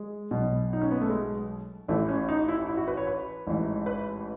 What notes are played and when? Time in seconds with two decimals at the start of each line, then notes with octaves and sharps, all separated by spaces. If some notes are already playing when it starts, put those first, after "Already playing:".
Already playing: G#3
0.31 B1 B2
0.73 D#4
0.81 C#4
0.91 B3
1.01 A3
1.10 G#3
1.88 A1 A2 E3 A3
2.09 C#4
2.29 D#4
2.48 E4
2.68 E4
2.77 F#4
2.87 B4
2.97 C#5
3.07 B4
3.47 A1 G#2 E3
3.86 B4